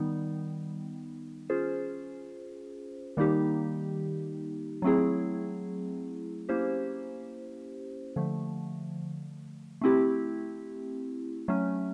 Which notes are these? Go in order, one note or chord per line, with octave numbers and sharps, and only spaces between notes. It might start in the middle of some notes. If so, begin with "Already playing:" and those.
Already playing: D#3 G3 B3 D#4
C#4 F4 G#4 C5
D#3 G3 A#3 D#4 G4
F#3 A3 C4 E4 G#4
A#3 C#4 E4 G4 C5
D3 F3 A3
A3 C4 E4 G4
F#3 A3 C#4